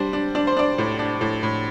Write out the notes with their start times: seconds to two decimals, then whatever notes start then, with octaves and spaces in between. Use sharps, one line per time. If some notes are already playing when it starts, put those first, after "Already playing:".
Already playing: G3 D4 C5
0.13 D4
0.35 D4 D5
0.47 C5
0.57 D4 D5
0.78 A2
0.99 D4
1.21 A2
1.43 A2